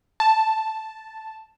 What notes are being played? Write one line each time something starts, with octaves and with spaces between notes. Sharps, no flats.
A5